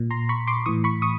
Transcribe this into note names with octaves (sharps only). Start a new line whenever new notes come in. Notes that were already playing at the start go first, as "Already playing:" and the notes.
Already playing: A#2
A#5 C6
B5 C#6
C6 D6
A2 E3 C#6 D#6
B5 C#6
C#6 D#6